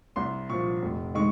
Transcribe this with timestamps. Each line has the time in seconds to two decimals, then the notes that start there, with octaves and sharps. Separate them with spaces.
0.16 C2 C6
0.49 A#2 F3 C#6
0.82 F1
1.15 D#3 G#3 C#6